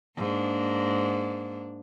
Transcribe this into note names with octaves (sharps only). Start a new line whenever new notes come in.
G#2 A#3 D4